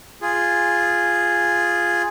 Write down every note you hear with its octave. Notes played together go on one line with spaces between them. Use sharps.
F4 G#4